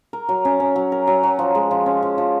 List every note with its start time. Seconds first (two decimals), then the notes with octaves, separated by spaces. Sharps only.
0.13 A#4
0.29 F#3
0.45 C#4
0.60 C#4
0.76 F#3
0.92 A#4
1.07 F#3
1.23 F#3
1.39 F3
1.55 G#3
1.71 F3
1.86 C#4
2.02 F3
2.18 F3